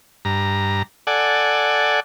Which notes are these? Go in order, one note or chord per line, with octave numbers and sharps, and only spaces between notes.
G2 A#5
A4 D5 F#5 G#5